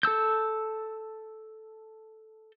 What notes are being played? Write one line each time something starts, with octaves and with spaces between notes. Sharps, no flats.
A4 A5 E6 G6